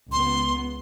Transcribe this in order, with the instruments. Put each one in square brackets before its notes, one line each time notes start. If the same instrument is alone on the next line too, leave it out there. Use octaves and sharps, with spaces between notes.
[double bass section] C#2 B3 [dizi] C6